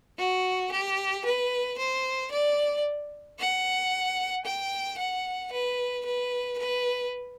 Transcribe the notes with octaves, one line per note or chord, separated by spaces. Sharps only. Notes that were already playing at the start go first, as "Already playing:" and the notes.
F#4
G4
B4
C5
D5
F#5
G5
F#5
B4
B4
B4